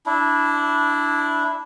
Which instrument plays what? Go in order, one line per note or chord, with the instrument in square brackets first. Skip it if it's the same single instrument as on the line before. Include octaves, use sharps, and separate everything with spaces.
[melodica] D4 E4